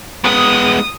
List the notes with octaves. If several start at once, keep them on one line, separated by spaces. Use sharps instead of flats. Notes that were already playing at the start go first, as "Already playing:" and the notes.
G#3 B3 D#6